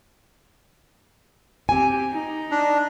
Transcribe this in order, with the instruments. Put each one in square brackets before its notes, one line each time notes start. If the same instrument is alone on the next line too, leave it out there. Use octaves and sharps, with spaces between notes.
[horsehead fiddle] C4 G4 [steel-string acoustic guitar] G#5
[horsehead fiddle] D#4
[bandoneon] D4